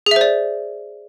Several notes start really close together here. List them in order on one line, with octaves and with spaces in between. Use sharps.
G#4 E5 C5 D5